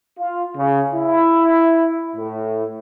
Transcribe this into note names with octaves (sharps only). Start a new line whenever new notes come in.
F4
C#3
E4
A2